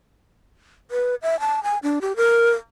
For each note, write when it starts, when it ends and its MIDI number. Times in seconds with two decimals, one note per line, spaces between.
0.91 1.15 71
1.22 1.39 76
1.40 1.63 81
1.63 1.78 80
1.83 1.99 62
2.02 2.16 67
2.16 2.50 70